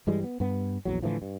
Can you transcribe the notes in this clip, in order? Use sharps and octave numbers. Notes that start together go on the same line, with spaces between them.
G2 E3 G3 G#3
B3
G2 B3
A#1 E2 F#3
A2 D3 E3 F3
G2